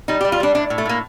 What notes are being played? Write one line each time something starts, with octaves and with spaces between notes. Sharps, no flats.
G3 D#4
G4
G3
F4
G3 D4
A2 D4
A2
A3
A2 A#3